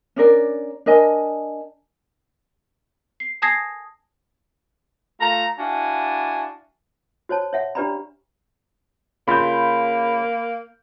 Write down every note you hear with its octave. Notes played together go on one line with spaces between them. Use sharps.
C#4 D4 A#4 D5
D4 A#4 D#5 G#5
C7
G#5 A5 D#6 G#6 A#6 C7
A3 F4 A#5
D4 E4 F#4 F5 G#5
F#4 C5 C#5 A5
C#5 E5 F#5
D4 G4 B4 D5 A#5 B5
C#3 A#3 F4 B5 G6